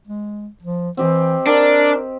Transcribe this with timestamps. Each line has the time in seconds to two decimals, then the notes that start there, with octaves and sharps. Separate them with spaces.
0.07 G#3
0.62 F3
0.97 E3 C4 G4 D#5
1.47 D4 A#4